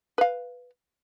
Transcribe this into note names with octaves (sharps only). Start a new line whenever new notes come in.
B4 F5